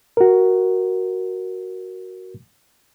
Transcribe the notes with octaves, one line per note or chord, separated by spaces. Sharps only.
F#4 A#4